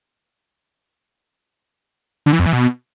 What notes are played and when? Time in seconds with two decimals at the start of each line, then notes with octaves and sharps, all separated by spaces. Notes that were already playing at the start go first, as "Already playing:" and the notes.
2.26 D3
2.33 E3
2.39 F2
2.46 E3
2.53 B2